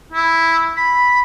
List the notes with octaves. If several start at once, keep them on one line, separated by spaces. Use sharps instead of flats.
E4
B5